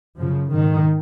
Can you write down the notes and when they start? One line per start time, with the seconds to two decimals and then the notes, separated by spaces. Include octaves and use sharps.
0.18 F#2 C#3 F3
0.50 G#2 D#3